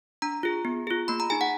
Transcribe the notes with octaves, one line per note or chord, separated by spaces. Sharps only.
D4 A#5
F4 G#4
B3
F4 G#4
A#3 B5
A#5
D#4 G#4 G#5
F#5